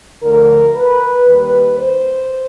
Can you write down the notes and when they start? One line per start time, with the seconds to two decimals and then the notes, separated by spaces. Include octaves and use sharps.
0.22 D2 D3 F3 A3 A#4
0.75 B4
1.25 D#2 D#3 G3 B4
1.78 C5